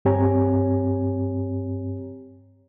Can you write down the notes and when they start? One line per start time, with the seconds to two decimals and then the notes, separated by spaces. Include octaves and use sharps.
0.05 G2 C4 G4 C#5 G#5 A#5